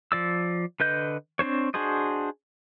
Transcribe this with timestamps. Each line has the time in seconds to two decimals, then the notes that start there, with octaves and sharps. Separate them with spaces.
0.12 F3 D5 E6
0.80 D3 B4 D#5 G6
1.39 C4 D4 C5 C#5
1.74 D4 F#4 G#4 C5 D#5